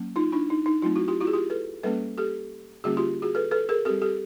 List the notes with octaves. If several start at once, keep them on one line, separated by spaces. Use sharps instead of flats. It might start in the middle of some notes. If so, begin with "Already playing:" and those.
Already playing: F#3 A#3 C#4
D#4 F4
D4 E4
D#4
D#4
F#3 A3 C4 D#4 F4
E4 F#4
F4 G4
E4 F#4
G#4
F4 G4
A4 B4
G3 A#3 C#4 A4 B4
G4 A4
D3 G3 A#3 C#4 F#4 G#4
F4 G4
F#4 G#4
A4 B4
A4 B4
G#4 A#4
G3 C4 G4 A4
G4 A4